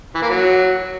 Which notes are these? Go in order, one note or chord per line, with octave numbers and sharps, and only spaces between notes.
E3
A#3
F#3